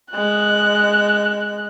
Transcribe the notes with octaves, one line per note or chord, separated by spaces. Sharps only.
G#3 F#6